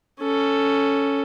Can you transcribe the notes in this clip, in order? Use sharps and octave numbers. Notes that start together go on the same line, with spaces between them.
C#4 A4